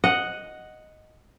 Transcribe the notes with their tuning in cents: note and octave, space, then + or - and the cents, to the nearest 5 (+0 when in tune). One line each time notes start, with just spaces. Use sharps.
D#5 +0 F#5 +0